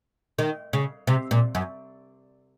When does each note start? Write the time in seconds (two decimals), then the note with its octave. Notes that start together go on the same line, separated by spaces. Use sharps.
0.39 D#3
0.73 C#3
1.07 C3
1.31 A#2
1.55 F#2